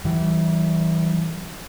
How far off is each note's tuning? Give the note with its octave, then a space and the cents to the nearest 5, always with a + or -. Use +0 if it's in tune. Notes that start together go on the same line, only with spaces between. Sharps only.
E3 -10 G3 -40